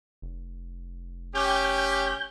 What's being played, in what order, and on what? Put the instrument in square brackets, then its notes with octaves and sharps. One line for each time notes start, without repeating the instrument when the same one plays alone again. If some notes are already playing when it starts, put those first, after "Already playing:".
[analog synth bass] F1
[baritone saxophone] C#4 [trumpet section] G4 [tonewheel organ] G6